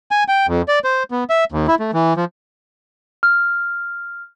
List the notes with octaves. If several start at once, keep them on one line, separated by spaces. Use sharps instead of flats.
G#5
G5
F2
D5
C5
B3
E5
D#2
E4
A3
E3
F3
F6